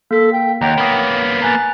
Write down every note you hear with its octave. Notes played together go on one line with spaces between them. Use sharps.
A#3 A4 B6
G5
D#2 C#5 F#5 G5 A#5
A#3 B3 B5 D#6
G#5 A#5 F#6 A6